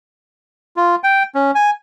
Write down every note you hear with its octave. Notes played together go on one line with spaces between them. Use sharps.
F4
G5
C#4
G#5